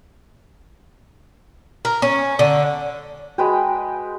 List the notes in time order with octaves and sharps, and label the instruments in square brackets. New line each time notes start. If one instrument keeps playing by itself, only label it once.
[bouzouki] A#4
C#4
D3
[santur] G#3 B4 G5 [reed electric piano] F#4